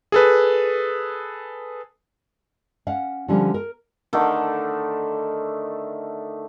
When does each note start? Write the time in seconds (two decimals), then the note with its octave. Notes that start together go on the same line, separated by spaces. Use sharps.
0.12 G#4 A4 B4
2.87 C#4 F5 F#5
3.28 D3 F3 G3 C#4
3.54 A#4
4.13 D3 D#3 A3 A4